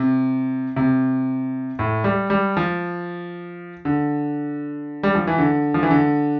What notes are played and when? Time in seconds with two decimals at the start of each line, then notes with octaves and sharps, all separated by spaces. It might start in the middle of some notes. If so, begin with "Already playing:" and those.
Already playing: C3
0.76 C3
1.79 A2
2.04 G3
2.30 G3
2.57 F3
3.85 D3
5.03 G3
5.15 F3
5.27 E3
5.38 D3
5.74 F3
5.83 E3
5.91 D3